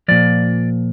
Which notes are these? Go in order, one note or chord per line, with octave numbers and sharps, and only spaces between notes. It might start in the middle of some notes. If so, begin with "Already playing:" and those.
A#2 F3 D5